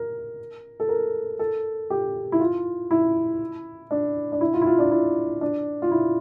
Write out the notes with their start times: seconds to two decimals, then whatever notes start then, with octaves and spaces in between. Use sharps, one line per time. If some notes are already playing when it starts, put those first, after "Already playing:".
Already playing: A#4
0.80 A4
0.89 A#4
1.39 A4
1.90 G4
2.32 E4
2.40 F4
2.91 E4
3.91 D4
4.32 D4
4.41 E4
4.54 F4
4.62 E4
4.66 F4
4.79 D4
4.91 E4
5.41 D4
5.82 F4
5.91 E4